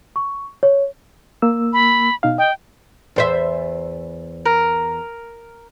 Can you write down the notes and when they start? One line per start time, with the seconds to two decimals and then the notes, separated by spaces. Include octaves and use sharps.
0.16 C#6
0.63 C#5
1.42 A#3 E6
1.73 B5
2.23 B2 D#4 F5
2.38 D#5 G5
3.16 E2 C5 E5
4.46 A#4